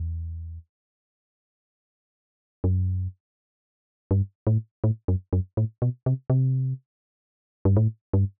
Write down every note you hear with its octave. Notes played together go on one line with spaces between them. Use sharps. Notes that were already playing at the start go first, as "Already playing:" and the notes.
Already playing: E2
F#2
G2
A2
A2
F#2
F#2
A2
B2
C3
C3
G2
A2
G2